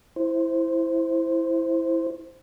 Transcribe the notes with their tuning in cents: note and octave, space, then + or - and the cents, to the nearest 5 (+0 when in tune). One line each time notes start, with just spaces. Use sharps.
E4 +0 C5 +0